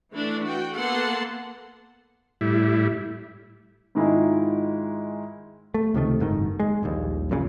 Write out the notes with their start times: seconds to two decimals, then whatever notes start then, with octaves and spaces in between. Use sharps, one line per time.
0.12 E3 A3 D4
0.44 F#4 G5
0.75 A#3 B3 A4 F#5 A5 C6
2.41 A2 G3 E4
3.95 G#2 D#3 G#3 E4 F4
5.74 A3
5.94 C#2 C3 D#3 A3
6.20 F#1 G#2 D#3
6.60 G#3
6.83 D#1 A#1 D#2
7.31 F#2 A#2 C#3